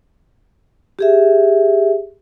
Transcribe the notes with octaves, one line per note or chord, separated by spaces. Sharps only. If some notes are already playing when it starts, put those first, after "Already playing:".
G4 G#4 E5